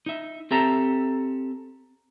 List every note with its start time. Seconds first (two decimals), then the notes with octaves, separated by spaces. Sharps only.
0.06 D#4 E5
0.51 C4 G4 A4 E5 A#5